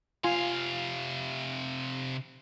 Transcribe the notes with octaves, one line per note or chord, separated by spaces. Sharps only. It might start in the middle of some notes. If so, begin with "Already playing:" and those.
C3 F4 F5 G#5 C6